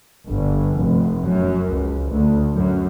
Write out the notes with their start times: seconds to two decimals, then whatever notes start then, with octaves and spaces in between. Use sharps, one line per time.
0.29 G1
0.81 F1
1.27 F#2
1.71 C#2
2.10 D2
2.55 F#2